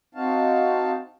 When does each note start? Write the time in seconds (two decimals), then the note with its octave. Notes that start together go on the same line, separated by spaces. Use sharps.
0.15 C4 D#4 F#4 F5 A5